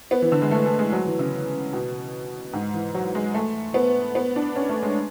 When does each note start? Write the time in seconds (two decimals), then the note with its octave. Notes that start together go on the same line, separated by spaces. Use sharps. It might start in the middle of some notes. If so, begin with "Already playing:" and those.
0.11 B3
0.22 E3
0.32 D3
0.42 G#3
0.51 A3
0.65 A3
0.79 G#3
0.92 F#3
1.06 E3
1.19 C#3
1.73 B2
2.53 G#2
2.74 E3
2.94 F#3
3.15 G#3
3.34 A3
3.74 B3
4.15 B3
4.36 D4
4.56 C#4
4.69 A3
4.83 G#3